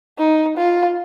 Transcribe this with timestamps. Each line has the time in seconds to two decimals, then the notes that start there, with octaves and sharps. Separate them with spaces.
0.19 D#4
0.57 F4